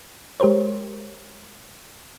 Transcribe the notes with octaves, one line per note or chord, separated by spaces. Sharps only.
G#3 G4 A#4 C5 C#5